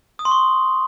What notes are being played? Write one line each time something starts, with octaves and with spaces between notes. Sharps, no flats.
D#6
C6
C#6